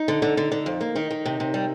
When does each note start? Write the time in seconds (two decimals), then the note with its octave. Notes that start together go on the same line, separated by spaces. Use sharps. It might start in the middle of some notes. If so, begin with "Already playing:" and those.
Already playing: D#4
0.08 D3
0.22 D3
0.37 D3
0.52 D3
0.66 F2
0.81 A#3
0.96 D#3 D#4
1.11 D#3
1.26 C3
1.40 C3
1.54 G3